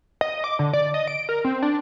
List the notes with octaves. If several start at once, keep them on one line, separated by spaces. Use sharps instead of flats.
D#5
D6
D3
D5
D#5
D7
A#4
C4
D4